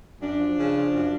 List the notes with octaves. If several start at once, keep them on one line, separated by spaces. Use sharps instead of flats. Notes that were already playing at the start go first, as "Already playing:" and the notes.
F#2 D4
F3
C#3
F3
F#2